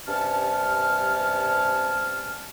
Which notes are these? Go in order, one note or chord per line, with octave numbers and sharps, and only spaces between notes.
G2 C3 C#4 A5 F6